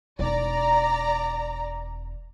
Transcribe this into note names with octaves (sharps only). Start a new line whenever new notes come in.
E1 D#4 D5 A#5